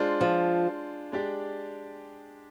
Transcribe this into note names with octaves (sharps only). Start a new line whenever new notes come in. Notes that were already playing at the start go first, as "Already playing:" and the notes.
Already playing: G#3 D4 F4 C5
F3
G#3 D4 G4 D5